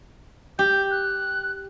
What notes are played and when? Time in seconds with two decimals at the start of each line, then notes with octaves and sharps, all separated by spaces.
0.59 G4 G6
0.91 F#6